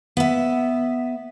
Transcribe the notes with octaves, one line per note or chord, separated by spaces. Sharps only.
B3 E5